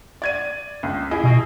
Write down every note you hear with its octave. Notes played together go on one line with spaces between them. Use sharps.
D5 G#6 D#7
C#2
E4 G#4 D#5
B2